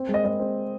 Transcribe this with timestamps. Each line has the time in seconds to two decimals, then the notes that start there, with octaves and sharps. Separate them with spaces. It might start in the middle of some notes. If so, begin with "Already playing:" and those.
Already playing: C4
0.09 G#3
0.14 D#5
0.25 G#3 D#5
0.40 C4